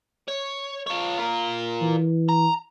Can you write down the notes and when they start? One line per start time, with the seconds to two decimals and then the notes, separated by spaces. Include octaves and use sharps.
0.28 C#5
0.86 F4 C#5
1.19 F4 A#4
1.81 E3
2.29 A#5